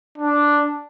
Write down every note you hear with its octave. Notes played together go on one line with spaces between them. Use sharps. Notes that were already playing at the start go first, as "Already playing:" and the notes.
D4